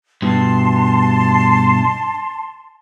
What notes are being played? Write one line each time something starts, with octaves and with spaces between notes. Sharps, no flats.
G2 B2 A5 C6